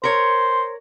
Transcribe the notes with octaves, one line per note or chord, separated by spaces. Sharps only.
A#4 C5 C#5